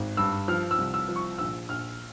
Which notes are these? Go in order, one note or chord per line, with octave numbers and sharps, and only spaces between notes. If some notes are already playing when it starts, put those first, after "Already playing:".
Already playing: G#1
G2 E6
F3 F6
E6
C2
E6
F3
C#6
A#1 E6
A#1 F6